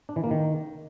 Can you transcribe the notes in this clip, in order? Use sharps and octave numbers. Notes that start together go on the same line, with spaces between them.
D4
E3
A#3
D#3